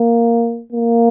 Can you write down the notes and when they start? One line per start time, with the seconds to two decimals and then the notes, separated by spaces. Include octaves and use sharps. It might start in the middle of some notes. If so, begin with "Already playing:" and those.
Already playing: A#3
0.72 A#3